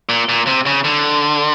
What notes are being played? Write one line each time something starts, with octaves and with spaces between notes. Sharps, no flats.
A#2
A#2
C3
C#3
D3